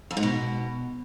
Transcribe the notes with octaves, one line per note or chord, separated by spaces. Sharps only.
F2
G#2
B2